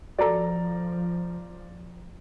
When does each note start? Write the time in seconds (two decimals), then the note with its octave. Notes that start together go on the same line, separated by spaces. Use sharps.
0.19 F3 F#4 A4 D5 A#5